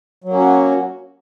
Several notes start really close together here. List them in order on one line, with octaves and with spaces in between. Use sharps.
F#3 A#3 C#4 F#4